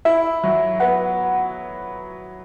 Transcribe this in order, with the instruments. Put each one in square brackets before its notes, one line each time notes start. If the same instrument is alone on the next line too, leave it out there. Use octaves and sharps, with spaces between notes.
[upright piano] E4 [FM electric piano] E5
[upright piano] F#3
[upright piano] B3 [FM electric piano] F#5